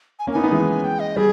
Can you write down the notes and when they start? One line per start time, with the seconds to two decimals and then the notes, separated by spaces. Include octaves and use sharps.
0.19 G#5
0.27 A#3 C#4
0.33 B3 D#4 G#5
0.43 B3 D#4
0.51 E3 G#3
0.84 G5
1.00 D#5
1.16 G3 G#4